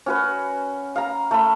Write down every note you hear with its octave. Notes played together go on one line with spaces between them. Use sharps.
C#4 F#4 B4
F5 A#5
A3 B5